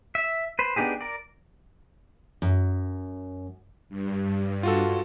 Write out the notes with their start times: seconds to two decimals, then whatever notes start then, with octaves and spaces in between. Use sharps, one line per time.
0.15 E5
0.59 B4 C5
0.76 B3 D4 D#4 G4 G#4
1.01 A#4 D5
2.42 F#2
3.89 G2
4.63 F4 F#4 A4